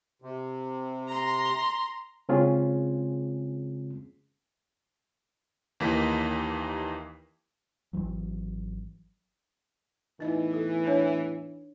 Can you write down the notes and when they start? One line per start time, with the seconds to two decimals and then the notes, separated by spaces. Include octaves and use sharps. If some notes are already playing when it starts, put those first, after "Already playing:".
0.22 C3
1.08 A#5 C6
2.29 C#3 G#3 C4 C#4 F4 G#4
5.80 D#2 E3 A#3 D#4 G4 B6
7.93 G#1 D#2 E3 F#3
10.20 E2 A2 E3 D#4 D#5
10.54 A4
10.86 D4 C#5